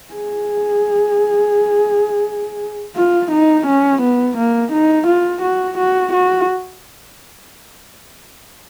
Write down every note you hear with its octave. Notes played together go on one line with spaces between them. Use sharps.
G#4
F4
D#4
C#4
B3
A#3
D#4
F4
F#4
F#4
F#4